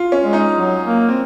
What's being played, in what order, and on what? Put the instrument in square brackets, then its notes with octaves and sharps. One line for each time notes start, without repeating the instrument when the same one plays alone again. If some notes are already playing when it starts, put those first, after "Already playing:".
Already playing: [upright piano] F4
C#4
[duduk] G#3
[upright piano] D#4
[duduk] F#3
A#3
[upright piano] C4